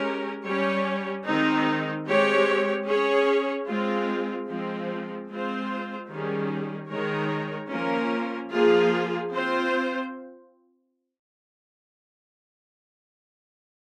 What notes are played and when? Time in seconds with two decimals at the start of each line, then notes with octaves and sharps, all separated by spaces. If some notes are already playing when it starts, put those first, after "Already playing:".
Already playing: G#3 C#4 G4 A#4
0.45 G3 C#4 G4 C#5
1.25 D#3 G#3 C4 D#4
2.06 G#3 C4 G4 C#5
2.87 C#4 G#4 C#5
3.68 G#3 C4 F4
4.49 F3 G#3 C4
5.28 G#3 C4 F4 C5
6.09 D#3 G3 C#4 G#4
6.90 D#3 G#3 D#4 A#4 C#5
7.71 F3 A#3 C#4 F4 A#4
8.52 F3 A#3 F4 G#4
9.33 C4 F4 C5